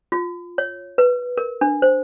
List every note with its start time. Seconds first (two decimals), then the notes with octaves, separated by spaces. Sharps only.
0.12 F4
0.58 C#5
0.98 B4
1.37 A#4
1.61 D4
1.82 C5